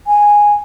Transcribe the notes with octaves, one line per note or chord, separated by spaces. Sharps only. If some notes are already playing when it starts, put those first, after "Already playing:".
G#5